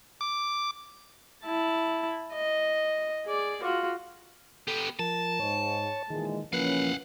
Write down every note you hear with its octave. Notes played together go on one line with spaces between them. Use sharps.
D6
E4 A5
D#5
G#4 D5
F4 F#4
B3 G4 A4
F3 A#4 A5
G#2 C#5
A#2 D#3 E3 G#3
C#3 E3 F3 A#3 C#4 B4 F5 F#5